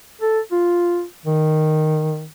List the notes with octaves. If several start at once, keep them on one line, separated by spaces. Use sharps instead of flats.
A4
F4
D#3